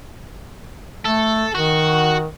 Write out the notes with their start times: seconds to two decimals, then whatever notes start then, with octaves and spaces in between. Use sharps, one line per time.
1.05 A3 A4
1.55 D#3 F#4